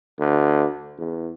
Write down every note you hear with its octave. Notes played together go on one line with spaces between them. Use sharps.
D2
E2